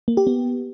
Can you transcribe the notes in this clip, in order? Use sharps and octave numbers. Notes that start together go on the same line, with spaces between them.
A#3
G4
B3